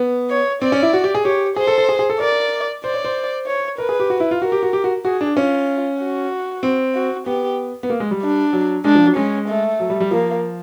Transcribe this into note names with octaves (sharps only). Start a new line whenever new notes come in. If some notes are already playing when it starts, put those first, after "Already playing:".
Already playing: B3
C#5
C4 D5
C#4
E4
F#4
G4
G#4
G4 C#5
G#4 C5
A4
A4
G#4
G#4
A4
A#4 D5
C5 D5
C#5
C5
C#5
A#4 B4
G#4
G4
F#4
E4
F4
F#4 A#4
G4
F#4
G4
F#4
F#4 G#4
D4
C#4 F4
F#4
C4
F#4
B3 G4
B3
A#3
G#3
G3
D4
F#3
G#3 D4
F3
F#3
G#3 C#4
A3
F#3
G3
G3
F3 A#3